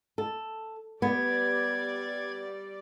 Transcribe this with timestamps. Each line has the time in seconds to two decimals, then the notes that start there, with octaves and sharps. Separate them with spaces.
0.18 A4
1.02 G3 B3 D5 G#6